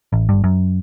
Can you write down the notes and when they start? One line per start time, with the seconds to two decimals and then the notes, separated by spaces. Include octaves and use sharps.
0.13 A1
0.29 G1 G2
0.44 F#2